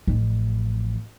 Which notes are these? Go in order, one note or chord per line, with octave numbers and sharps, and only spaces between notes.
A1 F3